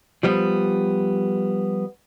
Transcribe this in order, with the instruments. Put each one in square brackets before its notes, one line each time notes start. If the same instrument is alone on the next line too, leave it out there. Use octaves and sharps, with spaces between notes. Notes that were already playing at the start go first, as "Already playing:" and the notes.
[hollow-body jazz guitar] F3 G3 B3